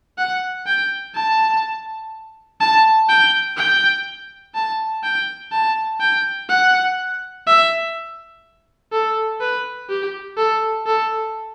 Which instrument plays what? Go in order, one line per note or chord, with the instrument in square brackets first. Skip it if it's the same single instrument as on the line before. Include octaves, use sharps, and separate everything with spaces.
[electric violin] F#5
G5
A5
A5
G5
G5
A5
G5
A5
G5
F#5
E5
A4
B4
G4
A4
A4